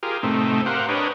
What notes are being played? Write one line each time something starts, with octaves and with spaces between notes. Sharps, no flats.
F4 G4 G#4 A#4
A2 C3 A3 C4 D#4
G4 A#4 C5 F5 F#5
D4 A#4 B4 C#5 D#5 G5